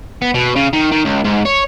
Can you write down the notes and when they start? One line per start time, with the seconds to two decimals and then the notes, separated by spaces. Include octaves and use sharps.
0.22 B3
0.34 B2
0.56 C#3
0.73 D#3
0.92 D#3
1.05 C#2
1.24 G#2
1.45 C#5